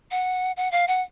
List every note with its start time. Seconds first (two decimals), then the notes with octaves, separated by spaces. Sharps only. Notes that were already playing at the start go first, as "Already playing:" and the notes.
0.11 F#5
0.57 F#5
0.72 F5
0.88 F#5